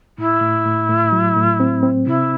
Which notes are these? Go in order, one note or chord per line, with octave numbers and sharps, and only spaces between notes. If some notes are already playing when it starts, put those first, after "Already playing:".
A2 E4
A2
A2
A2
F#3
A2
C4
C4
C3 E4